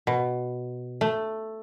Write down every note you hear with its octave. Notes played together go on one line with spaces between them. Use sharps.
B2
A3